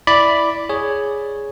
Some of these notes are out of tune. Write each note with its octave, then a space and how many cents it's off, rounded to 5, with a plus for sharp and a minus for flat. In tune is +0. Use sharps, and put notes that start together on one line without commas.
E4 +0 D5 +0 B5 +0
G#4 +0 C#5 +0